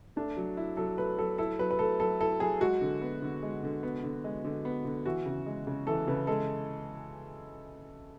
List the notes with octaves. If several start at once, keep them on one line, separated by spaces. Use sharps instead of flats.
A3 D4
F#3
E4
F#3 A4
A3 B4
F#3 A4
E4 A4
F#3 B4
B4
A3 A4
F#3 A4
E4 A4
F#3 G#4
G#3 F#4
D3
B3
D3
G#3
D3
B3
D3
G#3
D3
B3
D3
E3 F#4
C#3
G#3
C#3
E3 A4
C#3 B4
G#3 A4